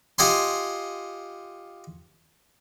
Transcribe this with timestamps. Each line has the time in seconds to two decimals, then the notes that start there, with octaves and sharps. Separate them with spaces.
0.18 F4 G4 D#5 F#5 G#5 C6